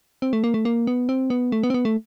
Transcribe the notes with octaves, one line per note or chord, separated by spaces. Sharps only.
C4
A3
A#3
A3
A#3
B3
C4
B3
A3
B3
C4
B3
A3